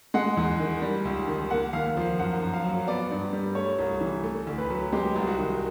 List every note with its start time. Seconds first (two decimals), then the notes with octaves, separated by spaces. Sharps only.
0.14 G#3 F#5
0.37 E2
0.60 D#3
0.82 G3
1.05 C#2
1.28 D#3
1.50 A#3 F#5
1.73 D#2 F5
1.97 F3
2.19 F#2 F#5
2.42 F#2
2.53 F5
2.64 F#3
2.88 B3 D5
3.11 G2
3.33 G3
3.55 A3 C#5
3.78 C2
4.01 E3
4.24 A3
4.47 D2
4.58 B4
4.70 F#3
4.92 G#3 G4
5.16 C2
5.27 F#4
5.38 D#3